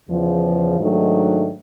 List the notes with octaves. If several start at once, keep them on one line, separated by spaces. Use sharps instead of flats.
E2 C#3 F3
G#2 D#3 F#3 A3 D4